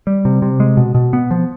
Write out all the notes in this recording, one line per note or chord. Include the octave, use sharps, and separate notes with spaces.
G3
C3
C3
G#3
B2
B2
B3
F3